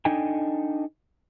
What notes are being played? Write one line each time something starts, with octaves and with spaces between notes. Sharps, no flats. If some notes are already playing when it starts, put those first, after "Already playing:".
D4 D#4 A4 D#5 G5 G#5